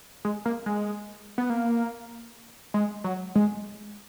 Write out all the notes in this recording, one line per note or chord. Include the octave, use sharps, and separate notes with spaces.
G#3
A#3
G#3
B3
A#3
G#3
F#3
G#3